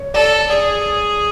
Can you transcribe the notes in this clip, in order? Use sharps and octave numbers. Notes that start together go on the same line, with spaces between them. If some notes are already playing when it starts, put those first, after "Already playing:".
Already playing: C#5
A4 D5
G#4 D5